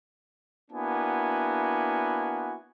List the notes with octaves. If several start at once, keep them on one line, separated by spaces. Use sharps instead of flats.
A#3 B3 D4 E4 F#4 G#5